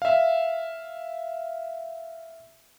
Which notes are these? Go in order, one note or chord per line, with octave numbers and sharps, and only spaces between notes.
E5 F5